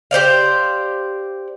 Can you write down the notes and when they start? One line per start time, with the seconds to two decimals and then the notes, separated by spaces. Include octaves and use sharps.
0.11 G4 C5 D5 F5